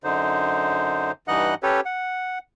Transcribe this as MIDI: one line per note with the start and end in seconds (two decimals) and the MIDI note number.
0.04 1.12 42
0.04 1.12 50
0.04 1.12 63
0.04 1.12 72
1.28 1.55 43
1.28 1.55 52
1.28 1.55 63
1.28 1.55 75
1.28 1.55 78
1.28 1.55 90
1.63 1.80 61
1.63 1.80 67
1.63 1.80 69
1.63 1.80 71
1.63 1.80 73
1.85 2.39 78